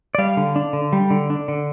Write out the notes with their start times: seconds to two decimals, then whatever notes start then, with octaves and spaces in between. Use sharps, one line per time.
0.15 D5
0.18 G3 F5
0.37 D3
0.56 D4
0.73 D3
0.93 G3
1.10 D3
1.30 D4
1.48 D3